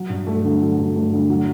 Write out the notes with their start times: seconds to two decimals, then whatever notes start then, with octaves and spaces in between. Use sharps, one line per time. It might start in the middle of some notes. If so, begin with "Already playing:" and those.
Already playing: F#3
0.10 G2
0.27 A3
0.45 D3
0.62 F#3
0.78 G2
0.96 A3
1.13 D3
1.30 F#3